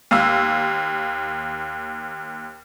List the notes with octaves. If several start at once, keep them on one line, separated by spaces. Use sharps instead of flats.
D#2 F5 E6